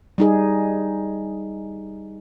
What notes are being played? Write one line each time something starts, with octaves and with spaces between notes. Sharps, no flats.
G3 D#4 G#4